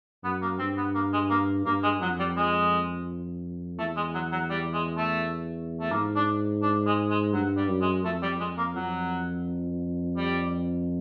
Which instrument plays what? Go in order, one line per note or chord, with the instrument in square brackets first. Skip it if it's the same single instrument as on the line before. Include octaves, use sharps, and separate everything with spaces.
[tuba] F#2 [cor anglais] B3
[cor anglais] A#3
[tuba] G2 [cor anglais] C4
[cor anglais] B3
A#3
G#3
A#3
[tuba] G2 [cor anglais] A#3
[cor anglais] G#3
[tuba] F2 [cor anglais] F#3
[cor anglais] G3
G#3
[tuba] E2 [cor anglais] A3
[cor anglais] G#3
F#3
F#3
G3
G#3
A3
A3
[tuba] G#2 [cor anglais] A#3
[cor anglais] D4
D4
G#3
G#3
[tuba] G2 [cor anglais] F#3
[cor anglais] G3
[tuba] F#2
[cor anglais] G#3
[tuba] F2 [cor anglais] A3
[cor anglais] G3
[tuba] F2 [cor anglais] G#3
[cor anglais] A#3
[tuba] F2 [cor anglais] F#3
[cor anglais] G3